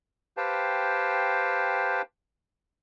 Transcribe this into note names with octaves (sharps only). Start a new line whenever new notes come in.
G4 B4 C5 F5 G5 A5